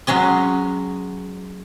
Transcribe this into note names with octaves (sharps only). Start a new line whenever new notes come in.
F#3 G#3 C#4 D#5